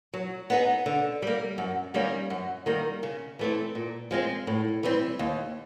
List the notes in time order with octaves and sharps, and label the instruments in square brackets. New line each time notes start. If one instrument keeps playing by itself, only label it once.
[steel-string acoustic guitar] F#3
B3 D#4 G#4
D3
G3 A#3
F#2
D#3 G3 A#3 C#4
F#2
D#3 G3 A#3
C#3
E3 A3 C4
A#2
F3 G#3 C4
A2
E3 G3 C4
D#2